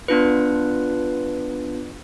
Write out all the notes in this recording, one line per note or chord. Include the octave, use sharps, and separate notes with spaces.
B3 D4 F4 B4